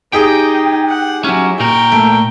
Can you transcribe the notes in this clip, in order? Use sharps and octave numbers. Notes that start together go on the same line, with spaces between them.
D#4 G4 G#4 G5 D#6
F#5
F#3 C#4 E4
A#2 A#4 G5 C#6
A3 D7